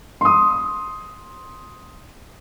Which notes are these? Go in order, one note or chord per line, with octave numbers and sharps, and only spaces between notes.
C6 D#6